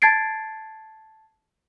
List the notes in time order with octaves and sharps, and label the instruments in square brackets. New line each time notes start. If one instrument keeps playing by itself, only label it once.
[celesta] A5 G#6 A6 C7 D7